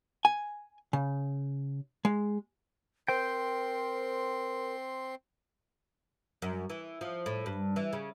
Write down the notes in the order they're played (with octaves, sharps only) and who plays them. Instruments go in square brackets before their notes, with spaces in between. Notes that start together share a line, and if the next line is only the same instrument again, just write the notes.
[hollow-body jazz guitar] G#5
C#3
G#3
[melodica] C4 C6 [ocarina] A#4 [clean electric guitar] C5 G5
[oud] F#2
E3
F3
A2
G2
E3
C#3